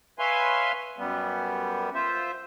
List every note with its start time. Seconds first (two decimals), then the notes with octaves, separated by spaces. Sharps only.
0.19 B4 C#5 E5 F5 G#5 C6
0.98 F#2 G3 B3
1.94 F4 C5 E5